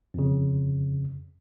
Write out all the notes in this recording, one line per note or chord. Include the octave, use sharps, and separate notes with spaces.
F2 C#3